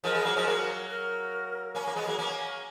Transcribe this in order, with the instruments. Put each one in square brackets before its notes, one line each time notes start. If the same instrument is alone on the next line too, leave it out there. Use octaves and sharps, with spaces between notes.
[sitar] F3 G#3 [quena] A#4
[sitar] G#3 B3
F#3 A#3
F3 G#3
F#3 A#3
[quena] A#4
[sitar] A#3 C#4
A#3
G#3 B3
F#3 A#3
A#3 C#4